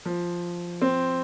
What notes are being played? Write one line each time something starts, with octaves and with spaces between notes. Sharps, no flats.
F3
C4